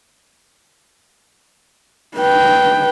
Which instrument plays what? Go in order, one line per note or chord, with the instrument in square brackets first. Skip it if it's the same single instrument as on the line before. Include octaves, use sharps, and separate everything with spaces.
[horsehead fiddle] B4 G5